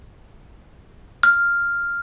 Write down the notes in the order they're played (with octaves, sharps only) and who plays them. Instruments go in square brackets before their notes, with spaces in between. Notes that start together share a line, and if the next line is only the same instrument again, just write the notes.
[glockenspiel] F6